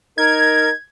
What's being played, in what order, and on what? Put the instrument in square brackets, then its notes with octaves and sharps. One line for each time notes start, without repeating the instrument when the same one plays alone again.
[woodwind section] D#4 A#4 [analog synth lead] G#6